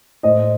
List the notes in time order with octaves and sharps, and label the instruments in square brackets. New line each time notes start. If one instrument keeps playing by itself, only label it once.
[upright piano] A2 C5 D#5